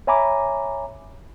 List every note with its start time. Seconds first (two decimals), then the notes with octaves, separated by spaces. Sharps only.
0.07 C#5 E5 G#5 A#5 B5 D6